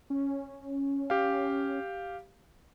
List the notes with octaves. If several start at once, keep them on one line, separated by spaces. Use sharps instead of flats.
C#4
G4 F5